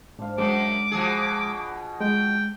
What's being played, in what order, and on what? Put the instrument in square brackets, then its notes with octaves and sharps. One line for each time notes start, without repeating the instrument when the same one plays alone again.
[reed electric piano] G#2 [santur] D4 C5 F5
[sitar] F#2 [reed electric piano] G#3 [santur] D4 [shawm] D6
[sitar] B2 F3 G#4
[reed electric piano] G#3 [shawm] G5